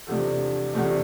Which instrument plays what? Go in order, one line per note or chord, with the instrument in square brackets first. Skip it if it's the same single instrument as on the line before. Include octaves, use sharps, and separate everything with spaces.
[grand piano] E2 C3 F3 A3 D4 A4
E2 C3 F3 A3 D4